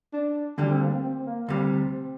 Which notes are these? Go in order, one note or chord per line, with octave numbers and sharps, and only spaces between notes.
D4
D2 D3 G3 D4
C4
A#3
C4
C4
A#3
D2 C3 G3 C4